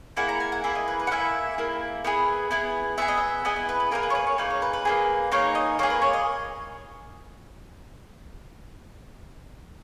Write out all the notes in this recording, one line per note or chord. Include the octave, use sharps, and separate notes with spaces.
A#3 E4 G#4 F#5
A#5
G#5
F#5
A#3 E4 G#4 E5
D#5
B4
B4
F#5
A#3 E4 G#4 E5
A#3 E4 G#4
B3 E4 G#4
B3 E4 G#4
B3 E4 G#4 E5
D#5
E5
B3 E4 G#4 D#5
D#5
B4
B4
A#3 D#4 G#4 A#4
B4
C#5
B4
C#5
A#3 D#4 G#4 B4
C#5
B4
B4
A#3 D#4 G#4
A#3 D#4 G#4 C#5
D#5
A#3 D#4 G#4 C#5
B4
C#5
D#5